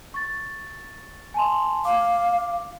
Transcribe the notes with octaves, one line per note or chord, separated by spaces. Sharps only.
C#6 A6
G#5 A5 C6
F5 D6